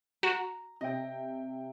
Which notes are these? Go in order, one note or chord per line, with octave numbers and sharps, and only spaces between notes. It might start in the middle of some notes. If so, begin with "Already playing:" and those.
F#4 A#5
C3 D#5 E5 G5